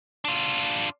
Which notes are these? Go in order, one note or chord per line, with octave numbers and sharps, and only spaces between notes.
D4 F4